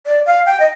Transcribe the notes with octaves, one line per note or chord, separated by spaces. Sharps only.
D5
F5
G5
D#5